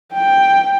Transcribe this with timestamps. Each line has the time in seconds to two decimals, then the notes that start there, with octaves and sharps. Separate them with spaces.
0.14 G5